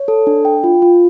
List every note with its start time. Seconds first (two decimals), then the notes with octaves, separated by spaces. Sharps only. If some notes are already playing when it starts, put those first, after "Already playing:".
Already playing: C#5
0.08 A4
0.27 D4
0.45 G5
0.64 F4
0.82 F4